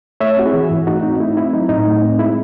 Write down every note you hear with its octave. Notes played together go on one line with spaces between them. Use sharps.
A3 C#5 E5
C4 F#4
E4 G#4
E3
G#2
A3 D#4 F#4
C4 D#4
A3 E4
C4 E4
F#3 D#4
A2 D#4
A3
C4
G#3 E4